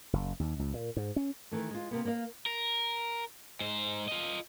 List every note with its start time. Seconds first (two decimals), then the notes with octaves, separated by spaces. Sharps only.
0.13 F#1
0.40 D#2
0.59 C#2
0.74 A#2
0.97 G#2
1.16 C#4
1.51 D#3 E3 A3
1.71 G#3 F4
1.91 C3 A#3 B3
2.05 A#3 A#4 D5 F5
2.46 A#4
3.61 G#2 C5
4.08 F4 D#5